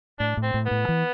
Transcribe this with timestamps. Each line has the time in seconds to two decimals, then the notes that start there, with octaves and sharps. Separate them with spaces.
0.19 A2 D4
0.37 A2
0.42 C4
0.54 A2
0.66 B3
0.71 A2
0.89 E3